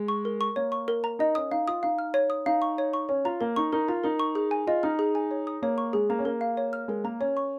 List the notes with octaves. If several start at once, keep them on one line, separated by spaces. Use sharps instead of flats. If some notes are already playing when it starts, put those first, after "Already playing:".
Already playing: G#3
C#6
A#4
C#6
A#3 C#5
C#6
A#4
A#5
D#4 D#5
C#4 D#6
D#4 F5
F4 D#6
D#4 F5
F6
C#5
D#6
D#4 F5
C#6
C#5
C#6
C#4 C#5
F4 A#5
A#3 A#4
D#4 C#6
D#4 A#4
F4 A#5
D#4 A#4
C#6
G#4
G#5
F4 D#5
D#4 F6
G#4
G#5
C#5
D#6
A#3 C#5
C#6
G#3 G#4
A#3 A#5
C#4
A#3 A#4
F5
C#5
F6
G#3 A#4
A#3 A#5
C#4 C#5
C#6